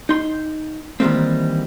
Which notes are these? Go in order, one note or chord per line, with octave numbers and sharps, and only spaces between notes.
D#4 C6
D#3 E3 G3 A3 A#3 C4